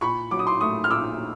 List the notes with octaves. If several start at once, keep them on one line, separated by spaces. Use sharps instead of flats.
A#2 B5 C#6
F#3 D6
D#6
C6 D6
A3 C#6 D#6
F6
A#2 D6 E6